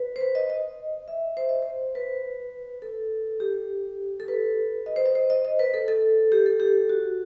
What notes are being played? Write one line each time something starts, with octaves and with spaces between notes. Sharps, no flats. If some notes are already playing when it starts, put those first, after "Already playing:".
Already playing: B4
C5
B4
D#5
D#5
E5
C5
D#5
C5
B4
A4
G4
A4
B4
D#5
C5
D#5
C5
D#5
D#5
B4
A4
A4
G4
A4
G4
F#4